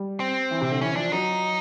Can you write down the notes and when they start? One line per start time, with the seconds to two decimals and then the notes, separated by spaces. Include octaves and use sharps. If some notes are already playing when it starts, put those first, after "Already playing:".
Already playing: G3
0.20 C4
0.51 E3
0.61 C3
0.71 D3
0.81 E3 C#4
0.92 E3
0.96 F3 D4
1.12 F#3 D#4